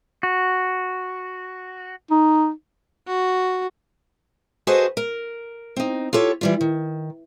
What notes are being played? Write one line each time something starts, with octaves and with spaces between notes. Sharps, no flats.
F#4
D#4
F#4
F#4 G#4 A4 B4 C5 D#5
A#4
C4 D#4
F4 G4 A4 C#5
E3 G3 F4
D#3